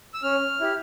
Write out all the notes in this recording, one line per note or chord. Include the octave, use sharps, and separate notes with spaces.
E6
C#4 F6
E4 G4